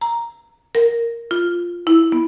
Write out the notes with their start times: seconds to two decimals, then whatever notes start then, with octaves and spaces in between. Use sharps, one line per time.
0.01 A#5
0.75 A#4
1.31 F4
1.87 E4
2.12 B3